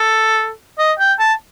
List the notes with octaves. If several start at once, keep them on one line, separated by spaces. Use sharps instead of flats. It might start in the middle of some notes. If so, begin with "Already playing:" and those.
Already playing: A4
D#5
G5
A5